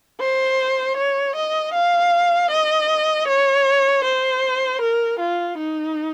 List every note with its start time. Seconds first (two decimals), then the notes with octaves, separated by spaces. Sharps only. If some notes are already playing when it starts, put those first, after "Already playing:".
0.20 C5
0.97 C#5
1.36 D#5
1.74 F5
2.51 D#5
3.28 C#5
4.04 C5
4.82 A#4
5.20 F4
5.58 D#4